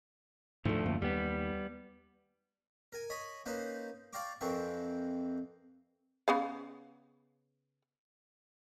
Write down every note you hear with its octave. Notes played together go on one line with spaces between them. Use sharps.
D2 G#2 D3 F3 A3
F#2 A#3
D#2 G3 B3
A#4 G#5
C#5 D#5 G#5 B5
A#3 C#4 D#4 B4 C5
D5 F5 G5 A#5 C#6 D6
F2 E3 C4 A#4 G5 C#6
C#3 B3 F5